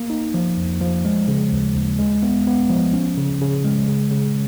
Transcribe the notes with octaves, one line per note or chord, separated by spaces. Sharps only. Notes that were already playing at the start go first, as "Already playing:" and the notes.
Already playing: A#3
D#4
F3
F2
F3
G#3
C#3
D#2
D#2
G#3
B3
B3
F3
C#4
C#3
C#3
G#3
C#3
C#3